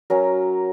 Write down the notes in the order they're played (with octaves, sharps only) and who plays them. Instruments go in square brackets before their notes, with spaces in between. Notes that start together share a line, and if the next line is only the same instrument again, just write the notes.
[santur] F#3 C#4 A#4